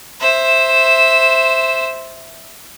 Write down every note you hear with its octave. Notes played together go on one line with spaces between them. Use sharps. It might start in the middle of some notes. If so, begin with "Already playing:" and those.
C5 E5